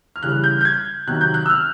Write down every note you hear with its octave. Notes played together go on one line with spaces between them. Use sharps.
F6
C#3 E3 G3 F#6
G6
G6
G#6
C3 D#3 F#3 F#6
G6
F#6
E6
F6